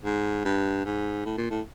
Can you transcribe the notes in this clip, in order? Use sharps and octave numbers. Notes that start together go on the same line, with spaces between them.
G#2
G2
G#2
A2
A#2
A2